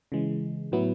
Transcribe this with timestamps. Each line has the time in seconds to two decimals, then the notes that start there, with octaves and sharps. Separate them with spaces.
0.12 C#3 E3 G#3
0.72 A2 F#3 B3 E4